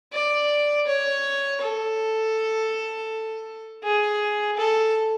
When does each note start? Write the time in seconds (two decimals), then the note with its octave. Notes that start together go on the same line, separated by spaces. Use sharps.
0.13 D5
0.87 C#5
1.61 A4
3.84 G#4
4.58 A4